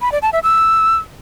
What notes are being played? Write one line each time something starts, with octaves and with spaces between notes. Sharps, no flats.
B5
D5
A5
E5
E6